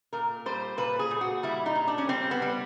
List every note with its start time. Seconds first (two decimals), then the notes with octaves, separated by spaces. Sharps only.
0.13 A#2 A#4
0.46 G3 C5
0.77 A#2 B4
0.99 G#4
1.11 A#2
1.21 F#4
1.43 G3 E4
1.66 D#4
1.75 A#2
1.88 D4
1.98 C#4
2.09 G3 C4
2.31 B3
2.42 G3